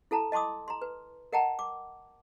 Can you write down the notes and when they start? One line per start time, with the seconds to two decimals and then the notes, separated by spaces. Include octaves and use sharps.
0.11 E4 A4 A5 A#5
0.32 D#5 A5 C6 D6 D#6
0.68 A#5 C6
0.82 B4
1.33 A#4 D#5 F#5 G5 A5 A#5
1.59 D6